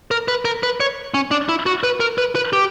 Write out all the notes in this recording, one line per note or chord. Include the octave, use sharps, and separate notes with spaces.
A#4
B4
A#4
B4
C#5
C#4
D4
E4
F#4
B4
A#4
B4
B4
G4